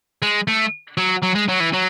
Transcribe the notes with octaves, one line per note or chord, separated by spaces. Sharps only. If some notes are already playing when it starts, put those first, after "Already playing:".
G#3
A3
F#3
F#3
G#3
F#3
E3
F#3